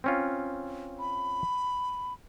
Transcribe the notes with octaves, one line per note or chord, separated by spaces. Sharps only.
C4 C#4 F4
B5